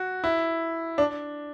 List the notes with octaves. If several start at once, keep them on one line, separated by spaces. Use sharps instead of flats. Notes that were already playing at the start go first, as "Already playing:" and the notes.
Already playing: F#4
E4
D4